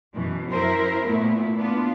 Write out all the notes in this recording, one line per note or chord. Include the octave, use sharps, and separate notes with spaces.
F#2 B2 E3
F#2 E4 A#4 C5
A#2 A3 B3 E4
B3 D4 F4